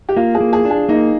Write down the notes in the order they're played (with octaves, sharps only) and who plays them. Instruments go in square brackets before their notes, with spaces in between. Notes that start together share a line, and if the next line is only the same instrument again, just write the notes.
[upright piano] G4
[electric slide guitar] A#3 [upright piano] F4
[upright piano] G#4
[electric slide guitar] A#3
[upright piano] G#4
[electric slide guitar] D4
[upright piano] G#4
[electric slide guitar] A#3 [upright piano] D#4